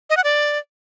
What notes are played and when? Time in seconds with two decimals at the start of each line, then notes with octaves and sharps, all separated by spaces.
0.10 D#5
0.17 F#5
0.24 D5